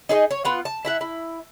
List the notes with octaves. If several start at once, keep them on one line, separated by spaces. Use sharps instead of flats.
D#4 G#4 B4 D#5
C#5
B3 F4 F#5
A5
E4 E5 F#5
E4